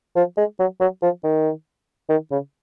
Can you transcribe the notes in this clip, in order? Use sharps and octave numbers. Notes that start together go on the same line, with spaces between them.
F3
G#3
F#3
F#3
F3
D#3
D#3
C#3